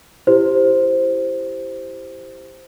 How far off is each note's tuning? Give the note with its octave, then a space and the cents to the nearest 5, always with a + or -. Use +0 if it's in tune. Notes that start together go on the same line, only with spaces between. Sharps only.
E4 +15 G4 +0 C5 +0